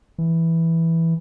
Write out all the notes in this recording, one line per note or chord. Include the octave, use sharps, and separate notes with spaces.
E3